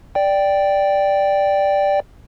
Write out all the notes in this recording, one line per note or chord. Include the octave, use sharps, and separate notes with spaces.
D5 G5